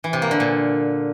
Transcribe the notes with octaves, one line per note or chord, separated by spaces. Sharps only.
E3
C3
A#3
D3
A#2